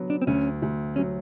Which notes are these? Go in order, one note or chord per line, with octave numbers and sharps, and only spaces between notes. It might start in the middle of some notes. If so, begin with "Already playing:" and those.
Already playing: D3 F#3 B3
D4
C4
D2 C#4
D2
F#3 C#4